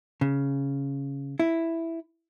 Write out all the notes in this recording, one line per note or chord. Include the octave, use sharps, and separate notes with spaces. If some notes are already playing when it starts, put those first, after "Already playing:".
C#3
E4